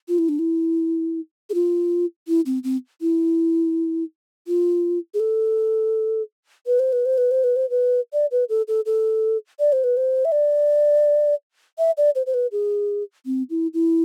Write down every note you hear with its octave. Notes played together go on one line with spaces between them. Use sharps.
F4
E4
D4
E4
G#4
F4
E4
C4
C4
E4
F4
G#4
A4
B4
C5
B4
C5
B4
C5
B4
C5
B4
D5
B4
A4
A4
A4
D5
C5
B4
C5
E5
D5
E5
D5
C5
C5
B4
G#4
C4
E4
E4